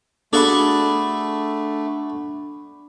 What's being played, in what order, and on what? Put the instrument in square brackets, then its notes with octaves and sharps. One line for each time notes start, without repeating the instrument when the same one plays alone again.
[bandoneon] A3 [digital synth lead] D4 [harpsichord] F#4 G#4 A4 [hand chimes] B5 D6